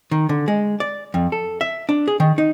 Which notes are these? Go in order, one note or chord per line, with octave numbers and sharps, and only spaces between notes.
D#3
D3
G#3
D5
F2
A4
E5
D4
G#4
D#3
D#4